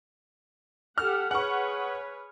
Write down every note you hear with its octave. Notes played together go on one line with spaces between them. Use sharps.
G4 A4 F#5 F6
G#4 B4 C#5 F#5 C#6